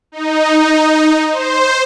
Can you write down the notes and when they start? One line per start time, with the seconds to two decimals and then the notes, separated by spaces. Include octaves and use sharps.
0.12 D#4
1.30 C5